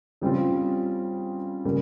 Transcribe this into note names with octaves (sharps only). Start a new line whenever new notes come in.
C#3 G3 C4 F4
C#3 G3 A#3